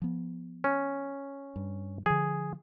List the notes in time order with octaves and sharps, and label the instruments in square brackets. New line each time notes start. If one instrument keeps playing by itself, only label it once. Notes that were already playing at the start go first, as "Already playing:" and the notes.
[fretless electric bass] F3 B3
[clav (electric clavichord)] C#4
[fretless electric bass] G2
[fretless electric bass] D3 F3 [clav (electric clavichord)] G#4